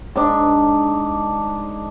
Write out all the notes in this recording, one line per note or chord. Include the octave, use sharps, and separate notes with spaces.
G#2 D4